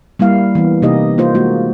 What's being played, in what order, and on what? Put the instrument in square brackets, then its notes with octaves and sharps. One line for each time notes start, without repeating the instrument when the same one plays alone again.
[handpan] G3 A#3 E4 F5
E3 B3
C3 A#3 D#4 G4 D#5
A#3 F4 C5
G#3 A#3 F#4